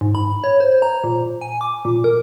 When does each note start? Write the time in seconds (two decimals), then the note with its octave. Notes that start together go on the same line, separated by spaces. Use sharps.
0.01 G#2
0.15 B5
0.44 C#5
0.60 C5
0.82 A#5
1.04 A#2
1.41 G#5
1.61 D6
1.85 A#2
2.04 A#4